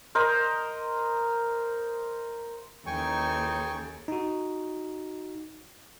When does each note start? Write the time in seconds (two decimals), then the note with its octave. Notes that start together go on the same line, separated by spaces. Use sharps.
0.15 A#4 C5 D#5
2.86 D#2 E3 C#4 D#4 A4 G5 G#5 C#6
4.08 D#4 F#4